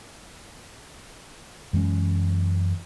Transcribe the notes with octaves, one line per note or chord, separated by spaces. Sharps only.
F#2 E3 G#3 C#4